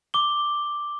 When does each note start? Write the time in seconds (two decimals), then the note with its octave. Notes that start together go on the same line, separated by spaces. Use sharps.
0.14 D6 G7